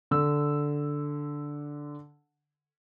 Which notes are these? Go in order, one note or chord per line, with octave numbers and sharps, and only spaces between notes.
D3 E6